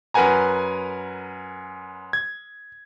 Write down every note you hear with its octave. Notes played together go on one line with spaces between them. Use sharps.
F#2 A#4 B4 F#5 G#5 A#5
G#6